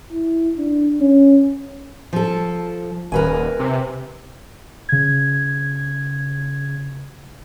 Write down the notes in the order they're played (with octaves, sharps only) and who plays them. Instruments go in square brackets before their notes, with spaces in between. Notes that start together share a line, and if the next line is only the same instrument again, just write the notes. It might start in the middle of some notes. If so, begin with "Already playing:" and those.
[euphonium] E4
D4
C#4
[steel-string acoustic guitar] F3 A4
[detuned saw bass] D#1 [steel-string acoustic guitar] A#4 B4 G#5
[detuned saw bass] C3
[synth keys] C#3 G#6